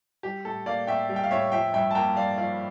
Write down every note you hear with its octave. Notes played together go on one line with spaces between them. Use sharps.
G3 G4
A2 A4
A#3 D5 F5
A2 E5 G5
G3
G5
F5
A2 C#5 E5
F3 E5 G5
G2 E5 G5
A5
A#3 G5 A#5
G2 D5 F5
F3 D5 F5